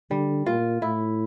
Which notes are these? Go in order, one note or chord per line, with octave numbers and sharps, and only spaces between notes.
D3 G3
A#2 F4
A2 E4